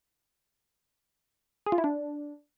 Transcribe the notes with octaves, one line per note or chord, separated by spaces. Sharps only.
G#4
F4
E4
D4